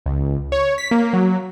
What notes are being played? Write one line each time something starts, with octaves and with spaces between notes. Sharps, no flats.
C#2
C#5
B6
A#3
F#3